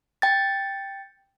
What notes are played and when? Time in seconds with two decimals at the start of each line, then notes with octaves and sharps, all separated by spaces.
0.22 G5 A6